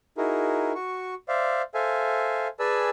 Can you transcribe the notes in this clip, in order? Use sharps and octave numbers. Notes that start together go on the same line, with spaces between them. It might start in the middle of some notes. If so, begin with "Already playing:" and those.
D#4 E4 F#4 G#4 A#4
F#4 C#6
C5 D5 E5 F5
A4 C5 E5 F5 G#5
G#4 B4 D5 G#5 A5 E6